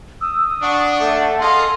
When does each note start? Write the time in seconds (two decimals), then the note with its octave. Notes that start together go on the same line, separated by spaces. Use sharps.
0.21 D#6 E6
0.62 D4 F#5 C#6
1.00 A3 A4
1.41 G#4 D#5 F5 C6